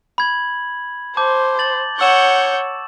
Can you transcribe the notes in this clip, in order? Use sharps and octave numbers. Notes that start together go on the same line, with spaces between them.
B5 G#6 F#7
C5 A5 D6 G6
A6 F#7
C#5 F#5 C#6 E6 G6 E7